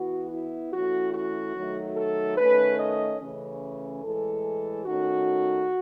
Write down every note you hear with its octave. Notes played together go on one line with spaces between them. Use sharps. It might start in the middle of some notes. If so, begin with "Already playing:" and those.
Already playing: E3 B3 F#4
E4
E3 A3 C#4 F#4
F#4
D#3 F#3 A3
A4
D#3 A3 C#4 B4
D#5
C#3 E3 A3 C#4
A2 E3 G#3 A4
D#3 A3 C#4 F#4